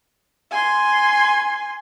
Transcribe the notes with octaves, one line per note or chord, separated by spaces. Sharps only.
G#5 C6